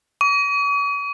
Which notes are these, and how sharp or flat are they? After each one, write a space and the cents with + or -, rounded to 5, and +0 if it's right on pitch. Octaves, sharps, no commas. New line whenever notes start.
C#6 +45